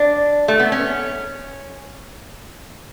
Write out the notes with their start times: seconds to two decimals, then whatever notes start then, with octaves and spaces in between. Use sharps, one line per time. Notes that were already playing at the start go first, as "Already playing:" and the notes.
Already playing: D4
0.48 A3
0.59 B3
0.72 C#4